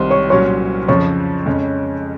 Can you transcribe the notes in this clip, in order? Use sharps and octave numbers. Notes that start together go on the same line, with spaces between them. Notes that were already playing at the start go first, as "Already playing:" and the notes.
Already playing: C2 C3 D#3 C5 C6
C#5 C#6
C2 A#2 F#3 C#4 C#5 C#6
F2 C#3 F3 C#5 C#6
F2 C#3 G#3 C#4